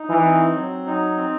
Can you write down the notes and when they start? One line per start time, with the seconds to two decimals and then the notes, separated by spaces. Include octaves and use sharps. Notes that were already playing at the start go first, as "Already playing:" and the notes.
Already playing: D#4
0.09 E3
0.24 C4
0.55 F#3
0.87 D#4
1.17 C4